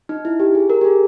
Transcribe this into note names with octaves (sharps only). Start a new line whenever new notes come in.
D#4
E4
G4
G#4
A#4
G4
G#4